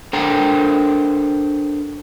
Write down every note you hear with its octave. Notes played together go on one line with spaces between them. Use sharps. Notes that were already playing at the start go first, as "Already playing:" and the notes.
D4 A4 A#4 C5 G5 A#5